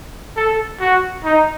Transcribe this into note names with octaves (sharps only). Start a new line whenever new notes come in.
A4
F#4
D#4